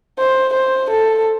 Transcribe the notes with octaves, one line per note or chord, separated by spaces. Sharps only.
C5
C5
A4